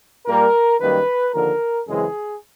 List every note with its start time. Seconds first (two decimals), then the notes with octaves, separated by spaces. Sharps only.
0.26 A#2 G3 A#3 A#4
0.79 F#2 D#3 G3 A#3 B4
1.33 D#2 D3 F3 A#4
1.86 F#2 C#3 E3 G#3 C4 G#4